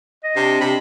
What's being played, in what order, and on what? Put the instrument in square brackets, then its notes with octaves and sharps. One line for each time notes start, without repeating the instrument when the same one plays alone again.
[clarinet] D#5
[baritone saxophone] C3 [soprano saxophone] C4 [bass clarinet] D4
[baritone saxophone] C3 [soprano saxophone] B5